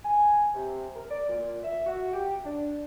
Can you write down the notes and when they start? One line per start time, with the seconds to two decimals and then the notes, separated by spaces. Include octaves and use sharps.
0.04 G#5
0.55 C3
0.94 A#4
1.10 D5
1.28 A#2
1.63 E5
1.86 F#4
2.14 G4
2.44 D4